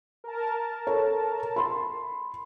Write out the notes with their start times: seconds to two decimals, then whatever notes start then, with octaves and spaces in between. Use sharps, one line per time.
0.24 A#4 A5
0.87 A4 C#5
1.56 B5 C6